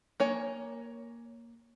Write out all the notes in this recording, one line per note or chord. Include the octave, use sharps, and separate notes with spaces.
A#3 C#5 G#5